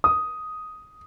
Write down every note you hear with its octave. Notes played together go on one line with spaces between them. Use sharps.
D#6